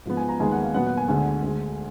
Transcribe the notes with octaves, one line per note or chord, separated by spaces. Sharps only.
G#2 F3 B3
G#5
A#5
D#2 D#3 G#3 B3 G#5
F#5
F5
A#2 F#3 B3 F#5
F#5
G#5
D2 D3 G#3 G#5
D2 D3 G#3